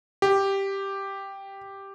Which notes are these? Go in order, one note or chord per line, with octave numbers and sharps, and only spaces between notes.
G4